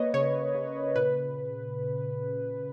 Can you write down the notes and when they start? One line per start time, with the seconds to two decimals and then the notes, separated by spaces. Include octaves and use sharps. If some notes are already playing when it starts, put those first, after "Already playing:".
Already playing: A#3 B4 C#5 D#5
0.14 C#3 C#5
0.55 C#3
0.96 A#2 B4